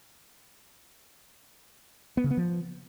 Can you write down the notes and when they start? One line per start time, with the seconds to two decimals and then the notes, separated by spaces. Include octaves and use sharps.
2.17 B3
2.24 C#3
2.31 B3
2.37 F3